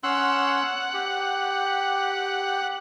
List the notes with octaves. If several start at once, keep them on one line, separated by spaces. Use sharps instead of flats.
C#4 F#5 C6 E6
G4